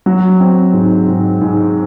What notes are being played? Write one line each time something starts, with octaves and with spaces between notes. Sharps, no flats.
F#3
C4
G#2
G#2
G#2